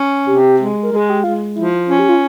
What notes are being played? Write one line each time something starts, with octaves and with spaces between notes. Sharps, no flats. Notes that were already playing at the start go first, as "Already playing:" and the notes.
Already playing: C#4
C3 G4
G#3
A#4
G#3
G#4
G4
G#3 F4
F3 E4
C#4 F4
G4
F4